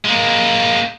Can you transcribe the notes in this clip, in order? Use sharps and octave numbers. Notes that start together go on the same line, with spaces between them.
G#3 A#3